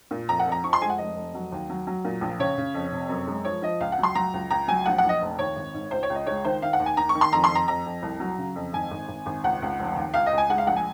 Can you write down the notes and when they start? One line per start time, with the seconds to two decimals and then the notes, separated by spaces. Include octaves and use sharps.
0.11 A#2
0.28 F2 A#5
0.39 F#5
0.46 F2
0.52 A#5
0.64 F3 C#6
0.73 C6
0.82 G#3 G#5
0.90 F#5
0.98 F1 D#5
1.16 F1
1.34 F#3
1.52 D#2
1.70 F#3
1.87 F#3
2.05 A#2
2.21 A#1
2.39 C#3 C#5
2.58 C#3
2.74 F2
2.92 C3
3.09 F#2
3.27 G#3
3.45 F3 C#5
3.62 F3 D#5
3.80 C#2 F5
3.92 F#5
3.99 F#3 C6
4.15 F#3 A#5
4.33 C#2
4.50 C#2 A#5
4.68 F#3 G#5
4.85 A#1 F#5
4.98 F#5
5.04 A#1 D#5
5.21 F1
5.39 D#2 C#5
5.56 G#1
5.74 G#2
5.91 C#2 C5
6.03 C#5
6.10 C#2
6.15 D#5
6.27 G#3 C#5
6.45 D#3 C5
6.62 D#3 F5
6.73 F#5
6.80 D#2
6.86 G#5
6.97 D#3 A#5
7.09 C#6
7.15 D#3
7.21 C6
7.32 F2 A#5
7.44 C6
7.50 F2
7.55 A#5
7.68 F2 A#5
7.86 F2
8.02 C2
8.20 F#3
8.38 C#3
8.56 F2
8.73 G#1 G#5
8.91 G#1
9.08 G#1
9.26 G#1
9.44 C#2 F#5
9.62 C#2
9.79 F1
9.96 D#2
10.14 C#2 F5
10.26 D#5
10.32 C#2
10.38 G#5
10.50 G#3 F#5
10.58 F5
10.67 A#1 F#5
10.76 G#5